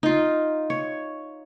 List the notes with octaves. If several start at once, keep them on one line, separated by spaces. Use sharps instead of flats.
D#4 F4
C#5